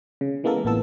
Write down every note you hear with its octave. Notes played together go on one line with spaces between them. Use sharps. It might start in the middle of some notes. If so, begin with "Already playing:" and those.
C#3
E3 G#3 A#3 B3 A4 A#4
A1 A#2 B3 A4 E6